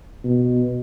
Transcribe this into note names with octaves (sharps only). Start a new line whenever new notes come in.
B2